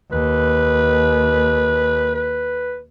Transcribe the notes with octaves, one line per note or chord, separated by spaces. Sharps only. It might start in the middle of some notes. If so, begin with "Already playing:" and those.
D#2 B4
B4